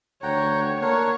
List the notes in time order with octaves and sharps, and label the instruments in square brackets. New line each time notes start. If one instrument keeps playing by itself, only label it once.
[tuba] D2 [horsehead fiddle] C#5 [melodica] F#5 G5 A#5
[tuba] A#3 [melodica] D4 A#4 F#5 [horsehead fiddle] C#5